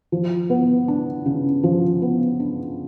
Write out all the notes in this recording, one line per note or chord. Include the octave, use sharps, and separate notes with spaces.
F3
B3
D4
C#3
F3
B3
D4